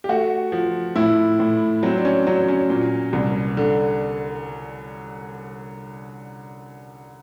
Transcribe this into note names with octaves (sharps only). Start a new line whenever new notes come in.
G4
A3 F#4
F3
A2 E4
A2
F#3 C4
D4
C#4
F#3 C#4
C#4
A#2
C2
D3